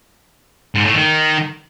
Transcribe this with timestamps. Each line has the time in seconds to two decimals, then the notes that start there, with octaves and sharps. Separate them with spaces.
0.75 G#2
0.85 A2
0.95 D#3